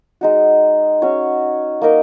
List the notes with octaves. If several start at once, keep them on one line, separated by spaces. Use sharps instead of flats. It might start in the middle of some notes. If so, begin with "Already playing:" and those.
G#3 D#4 F#4
C#4 F#4 C#5
A#3 D#4 A#4 D#5